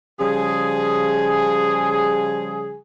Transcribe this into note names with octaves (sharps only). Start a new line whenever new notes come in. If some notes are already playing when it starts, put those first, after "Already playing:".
C#3 F3 G3 G#4